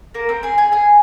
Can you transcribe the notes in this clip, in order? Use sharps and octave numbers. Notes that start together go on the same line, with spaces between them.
A#3 A#4
C4 C5
G#4 G#5
G#4 G#5
G#4 G#5